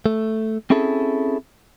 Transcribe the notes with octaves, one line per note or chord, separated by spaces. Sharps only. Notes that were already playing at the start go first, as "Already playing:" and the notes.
A3
C4 C#4 E4 G#4 A4